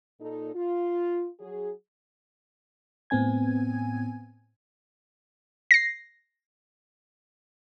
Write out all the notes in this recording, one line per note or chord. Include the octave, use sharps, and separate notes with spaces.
A#2 D#4 A4
F4
F#3 G#4
A2 B3 C4 G#5 G#6
A#6 C7